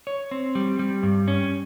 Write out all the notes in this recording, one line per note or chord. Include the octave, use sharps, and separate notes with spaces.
C#5
C4
G3
G3
G2
C#4